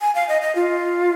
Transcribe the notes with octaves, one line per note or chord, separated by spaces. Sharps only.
G#5
F5
D#5
D#5
F4